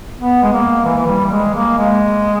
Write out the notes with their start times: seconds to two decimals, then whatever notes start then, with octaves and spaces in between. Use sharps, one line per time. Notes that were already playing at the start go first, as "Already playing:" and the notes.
0.20 B3
0.42 G#3
0.52 A#3
0.84 E3
0.98 E3
1.07 G3
1.31 G#3
1.54 A#3
1.78 G#3